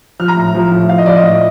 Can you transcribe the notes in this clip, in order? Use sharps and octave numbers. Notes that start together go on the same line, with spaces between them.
F3 F6
A#5
A2
F3
A2
F3 F5
D#5
F3 D5
D#5
A2